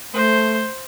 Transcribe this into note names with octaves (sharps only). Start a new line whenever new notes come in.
A3 C5